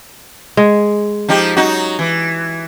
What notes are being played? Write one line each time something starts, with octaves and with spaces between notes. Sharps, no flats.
G#3
F3 D#4 G4
F#3 D#4 F#4
E3